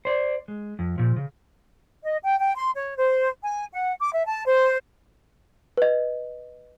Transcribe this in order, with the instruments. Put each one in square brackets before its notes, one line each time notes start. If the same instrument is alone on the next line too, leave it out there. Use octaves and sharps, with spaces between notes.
[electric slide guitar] C5 D5
G#3
F2
A#2 F3
C#3
[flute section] D#5
G5
G5
C6
C#5
C5
G#5
F#5
D6
E5
A5
C5
[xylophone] B4 D#5